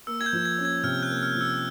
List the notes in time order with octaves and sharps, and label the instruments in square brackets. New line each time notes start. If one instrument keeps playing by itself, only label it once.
[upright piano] A#3 [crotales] E6
[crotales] G#6
G6
[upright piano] F3
[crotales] G#6
[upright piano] C#4
[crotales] G#6
[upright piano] C3 [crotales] F6
[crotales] F#6
[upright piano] A#3
[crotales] F6
[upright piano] F3
[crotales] E6